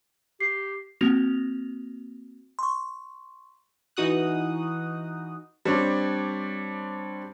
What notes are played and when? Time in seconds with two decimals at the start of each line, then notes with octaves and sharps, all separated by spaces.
0.40 G4 C7
1.01 A#3 C4 F#4 A#6 F7
2.59 C6 C#6
3.97 E3 D#4 F#4 D#6 F#6
5.65 G3 C4 D4 C#5